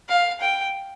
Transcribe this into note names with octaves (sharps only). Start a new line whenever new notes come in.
F5
G5